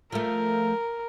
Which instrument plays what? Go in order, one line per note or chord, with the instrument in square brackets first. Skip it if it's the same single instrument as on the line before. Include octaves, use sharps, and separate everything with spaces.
[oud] F3 A3 [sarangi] A#4